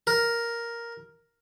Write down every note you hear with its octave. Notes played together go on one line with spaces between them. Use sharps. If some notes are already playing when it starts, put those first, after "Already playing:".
A#4